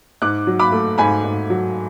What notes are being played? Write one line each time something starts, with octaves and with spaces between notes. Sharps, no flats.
G#2 D6 F#6
F#3
B5 D6
A3
G#2 G#5 B5
G#2
F#3